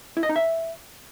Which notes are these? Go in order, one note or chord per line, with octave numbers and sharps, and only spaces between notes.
E4
D#5
D#4
E5